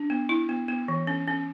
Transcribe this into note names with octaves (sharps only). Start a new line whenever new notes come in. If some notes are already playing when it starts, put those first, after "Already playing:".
Already playing: D4
B3
E4
B3
B3
E3
C#4
C#4